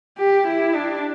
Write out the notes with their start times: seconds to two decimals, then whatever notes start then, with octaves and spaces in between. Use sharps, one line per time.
0.18 G4
0.47 E4
0.75 D4